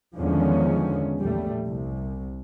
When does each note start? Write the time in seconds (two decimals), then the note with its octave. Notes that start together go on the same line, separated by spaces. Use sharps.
0.19 E2 D3 D#3 F3 G#3 C#4
1.22 A#1 E2 G3 A3
1.66 C2